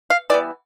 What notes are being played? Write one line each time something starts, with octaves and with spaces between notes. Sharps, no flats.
F5
E3 G3 B3 D5